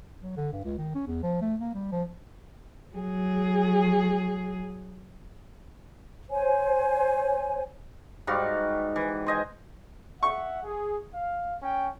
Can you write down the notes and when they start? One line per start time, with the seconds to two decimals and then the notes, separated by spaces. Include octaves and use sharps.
0.23 F#3
0.37 D3
0.52 G2
0.65 C#2
0.78 D#3
0.95 C#4
1.07 E2
1.23 F3
1.42 A3
1.60 A#3
1.74 G3
1.92 F3
2.95 F#3 G#4
6.30 C5 C#5 G#5
8.27 G#2 G3 F#4 F5
8.96 E3
9.26 C5 D#5 G#5
10.23 E5 F#5 C#6
10.64 G#4
11.14 F5
11.62 C#4 G5